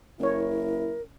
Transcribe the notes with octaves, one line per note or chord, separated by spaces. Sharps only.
F#1 C#4 E4 A#4 C#5